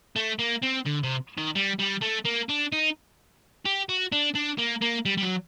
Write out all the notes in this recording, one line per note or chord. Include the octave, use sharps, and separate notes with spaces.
A3
A#3
C4
D3
C3
D#3
G3
G3
A3
A#3
D4
D#4
G4
F#4
D4
D4
A#3
A#3
G3
G3
F#3